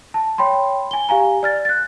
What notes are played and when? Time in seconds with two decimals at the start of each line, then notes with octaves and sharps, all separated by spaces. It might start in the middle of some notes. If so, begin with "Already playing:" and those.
0.14 A5
0.38 C#5 G5 B5 C6
0.91 G#5 G7
1.09 G4 F5 G#5 A#5
1.43 D5 F6 A6
1.65 F#6 A6